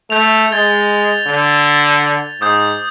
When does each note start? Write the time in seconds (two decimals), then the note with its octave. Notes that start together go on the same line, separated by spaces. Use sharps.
0.10 A3 G6 F7
0.52 G#3 G#6 A6 G7
1.27 D3
2.41 G#2 D6 D#6 G6